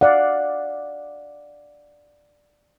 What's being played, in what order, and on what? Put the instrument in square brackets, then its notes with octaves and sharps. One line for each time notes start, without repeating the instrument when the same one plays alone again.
[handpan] D5 F5 F#5